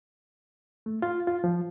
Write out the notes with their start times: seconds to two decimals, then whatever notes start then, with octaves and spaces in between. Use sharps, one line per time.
0.86 A3
1.02 F4
1.27 F4
1.44 F3